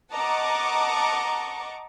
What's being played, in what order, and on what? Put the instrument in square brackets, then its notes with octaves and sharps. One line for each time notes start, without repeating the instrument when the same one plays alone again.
[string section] D#5 F#5 A5 A#5 C#6 D6